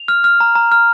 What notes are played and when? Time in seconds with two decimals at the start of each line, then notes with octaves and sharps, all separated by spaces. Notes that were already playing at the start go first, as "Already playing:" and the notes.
Already playing: F7
0.08 F6
0.24 F6
0.40 A#5
0.55 A#5
0.72 F6